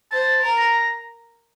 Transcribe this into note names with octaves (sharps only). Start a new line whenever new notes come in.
C5 A5
A#4
A#5